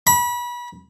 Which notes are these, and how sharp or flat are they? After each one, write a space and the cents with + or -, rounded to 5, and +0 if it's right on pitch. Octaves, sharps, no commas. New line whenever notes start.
B5 -30